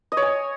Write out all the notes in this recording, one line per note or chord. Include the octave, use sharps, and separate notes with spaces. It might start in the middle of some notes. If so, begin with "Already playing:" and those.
D#5
C#5
G#5